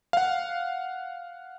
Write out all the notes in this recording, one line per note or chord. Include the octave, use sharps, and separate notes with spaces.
F5 F#5